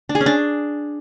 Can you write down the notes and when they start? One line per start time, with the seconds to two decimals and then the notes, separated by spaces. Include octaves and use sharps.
0.09 D4
0.15 G#4
0.21 C#4
0.26 D4